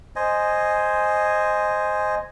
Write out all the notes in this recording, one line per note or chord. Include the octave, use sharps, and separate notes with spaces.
C5 D#5 G#5